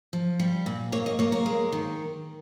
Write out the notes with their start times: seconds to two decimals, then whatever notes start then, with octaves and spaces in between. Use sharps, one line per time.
0.13 F3
0.40 G3
0.66 A#2
0.92 A#3 C#5
1.06 D#5
1.19 A#3 C#5
1.32 A#4
1.46 G#3
1.72 D#3